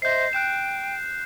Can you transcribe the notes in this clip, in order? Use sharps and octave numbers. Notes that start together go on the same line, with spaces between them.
C5 D#5 E5 G6 C7
G5 F#6 G6 E7